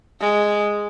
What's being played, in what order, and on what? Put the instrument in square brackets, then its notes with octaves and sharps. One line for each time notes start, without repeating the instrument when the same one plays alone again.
[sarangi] G#3